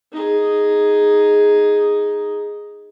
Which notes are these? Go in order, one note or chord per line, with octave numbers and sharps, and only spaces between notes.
D#4 G#4